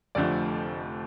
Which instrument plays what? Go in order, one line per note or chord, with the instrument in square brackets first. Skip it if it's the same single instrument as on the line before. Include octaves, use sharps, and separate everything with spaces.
[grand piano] F1 F2 D3 F3 A3 D5